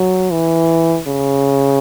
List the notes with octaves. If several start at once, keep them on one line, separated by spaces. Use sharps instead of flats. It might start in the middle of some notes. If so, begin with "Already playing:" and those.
Already playing: F#3
E3
C#3